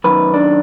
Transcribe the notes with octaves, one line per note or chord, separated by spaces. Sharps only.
F#2 D#3 B4
D4